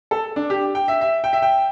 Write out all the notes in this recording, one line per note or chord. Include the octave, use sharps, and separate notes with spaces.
A4
D4
G4
G5
E5
E5
G5
E5
G5